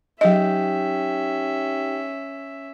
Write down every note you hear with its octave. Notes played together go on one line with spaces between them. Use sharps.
F#3 C#4 D#4 G4 D#5 E5 G5